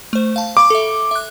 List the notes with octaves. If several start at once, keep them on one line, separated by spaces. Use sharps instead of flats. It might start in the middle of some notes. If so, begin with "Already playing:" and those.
A3 C5
F5 A5
F5 B5 C#6 D6
A4 E5
E5 F#6